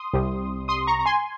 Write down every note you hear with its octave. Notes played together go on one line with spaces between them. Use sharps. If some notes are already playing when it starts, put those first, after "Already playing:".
Already playing: C6 D#6
C2 C3 G3
C6 D#6
A#5 C#6
A#5
G#5 C6